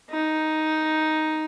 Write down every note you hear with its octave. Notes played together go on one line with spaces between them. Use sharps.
D#4